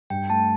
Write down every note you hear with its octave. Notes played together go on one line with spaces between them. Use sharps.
G2 G5
A3 A5